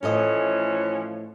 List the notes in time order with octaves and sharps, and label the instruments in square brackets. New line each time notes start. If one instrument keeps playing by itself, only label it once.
[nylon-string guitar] A2 A4 D#5 [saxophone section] E3 F3 C#4